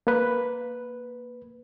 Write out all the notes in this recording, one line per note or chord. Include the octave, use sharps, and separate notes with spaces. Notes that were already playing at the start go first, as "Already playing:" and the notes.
A#3 B4